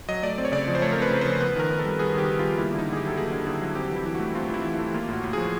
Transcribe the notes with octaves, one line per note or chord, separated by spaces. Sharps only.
F#3 D#5
A3 D5
C4
C#5
C#3 D5
F3
C5
A3 C#5
C4 A#4
B4
C#3
F3 C5
B3 B4
D#3 A#4
D#3
A4
G3
B3 G#4
D#3 G4
D#3
G3 F4
A#3 E4
D3 E4
D#4
D3 G#4
G4
F#3 A4
A#3 G#4
D3
D3 G#4
F#3
C4 G4
E3 E4
E3
A3 F#4
C4 F4
E3 E4
E3
A3 E4
A#3 F4
A2 F#4
A2
F3 G#4